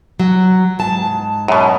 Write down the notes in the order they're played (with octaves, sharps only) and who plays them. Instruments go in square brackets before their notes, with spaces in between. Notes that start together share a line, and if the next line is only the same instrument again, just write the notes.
[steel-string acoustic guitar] F#3
G#2 A5
[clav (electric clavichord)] F#2 B2